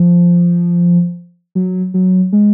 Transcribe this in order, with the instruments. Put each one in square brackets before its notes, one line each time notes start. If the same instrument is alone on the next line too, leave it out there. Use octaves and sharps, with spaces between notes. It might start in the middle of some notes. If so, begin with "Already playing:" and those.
Already playing: [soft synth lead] F3
F#3
F#3
G#3